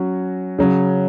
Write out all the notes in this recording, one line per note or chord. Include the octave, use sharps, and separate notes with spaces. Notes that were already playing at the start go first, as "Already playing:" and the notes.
Already playing: F#3 C#4 F#4
C#3 F#3 C#4